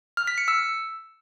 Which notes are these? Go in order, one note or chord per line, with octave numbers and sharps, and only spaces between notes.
F6
B6
C#7
E6